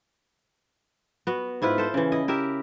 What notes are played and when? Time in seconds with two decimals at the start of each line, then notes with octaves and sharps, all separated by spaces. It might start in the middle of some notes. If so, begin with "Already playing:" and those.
1.27 B3 F#4
1.62 G#2 E4 F4 B4
1.78 A4 C5
1.94 C#3 E3
2.12 E4 D#5
2.28 E4 G4 A#4 E5